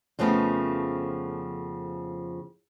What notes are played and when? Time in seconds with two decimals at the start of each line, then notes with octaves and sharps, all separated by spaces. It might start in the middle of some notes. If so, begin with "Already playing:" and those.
0.19 F2 C#3 F3 A3 B3